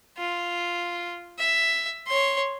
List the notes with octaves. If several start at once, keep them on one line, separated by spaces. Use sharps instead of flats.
F4
E5
C#5 C6